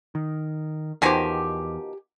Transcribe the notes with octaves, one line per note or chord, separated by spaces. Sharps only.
D#3
E2 B2 D#3 F3 G4 G#5